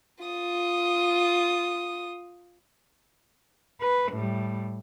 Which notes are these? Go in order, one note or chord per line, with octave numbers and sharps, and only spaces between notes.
F4 D#6
B4
A2 G3